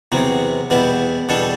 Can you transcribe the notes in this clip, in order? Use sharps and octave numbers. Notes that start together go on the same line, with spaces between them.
E2 C3 F#3 B3
E2 B2 G3 B3 E4
E2 B2 G3 D4 A4